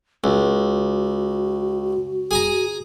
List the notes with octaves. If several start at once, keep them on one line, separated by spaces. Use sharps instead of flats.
C#2 F#4
G#4 G#5 A#5